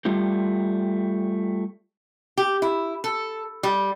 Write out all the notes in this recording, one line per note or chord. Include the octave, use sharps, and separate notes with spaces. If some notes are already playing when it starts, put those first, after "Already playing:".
G3 A3 F4 G4
G4
E4
A4
G3